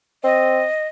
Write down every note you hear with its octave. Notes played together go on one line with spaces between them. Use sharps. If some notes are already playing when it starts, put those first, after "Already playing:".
C4 D#5